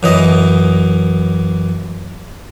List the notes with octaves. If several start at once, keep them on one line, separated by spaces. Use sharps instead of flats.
F#2 E3 D#5